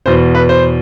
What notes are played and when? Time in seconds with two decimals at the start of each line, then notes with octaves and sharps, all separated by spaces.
0.06 E2 B2 B3 C5
0.35 B4
0.49 C5